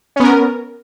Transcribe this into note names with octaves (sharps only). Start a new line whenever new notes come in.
B3 C#4 A#4